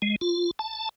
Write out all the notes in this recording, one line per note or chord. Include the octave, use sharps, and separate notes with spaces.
G#3
F4
A5